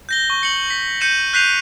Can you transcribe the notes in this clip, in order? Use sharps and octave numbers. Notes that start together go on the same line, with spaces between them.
G6 A#6 G7
C#6
C#7 F#7
B6
G6 C#7 D#7 E7
F#6 G6 B6 C7 D#7 F7